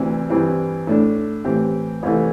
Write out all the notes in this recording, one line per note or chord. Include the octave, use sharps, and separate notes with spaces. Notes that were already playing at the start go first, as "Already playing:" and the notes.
Already playing: D2 C3 E3 C4
G2 E3 C4 E4
A2 A3 D4
A2 E3 C4 G4
C2 C3 E3 A3